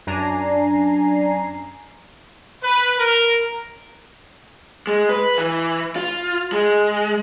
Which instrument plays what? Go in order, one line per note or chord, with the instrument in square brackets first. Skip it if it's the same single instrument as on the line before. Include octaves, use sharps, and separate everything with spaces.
[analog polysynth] F#2 D4 G#5 A#5 C7
[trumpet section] B4
A#4
[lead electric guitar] G#3
B4
E3
F4
G#3